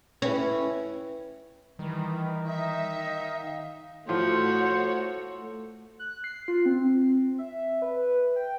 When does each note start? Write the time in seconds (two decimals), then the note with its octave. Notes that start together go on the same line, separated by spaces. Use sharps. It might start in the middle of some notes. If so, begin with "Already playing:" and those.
0.22 C#4 E4 B4 G5
1.79 D#3 E3 G3
2.47 D#4 E5
3.09 F5
4.09 A2 F3 A3 F#4 C5 C#5 F#5
5.99 F#6
6.24 C7
6.48 F4
6.66 C4
7.39 E5
7.82 B4
8.36 G5